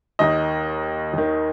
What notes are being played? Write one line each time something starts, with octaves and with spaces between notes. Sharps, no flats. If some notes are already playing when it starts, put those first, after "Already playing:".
D#2 D#3 D#5
D#2 D#3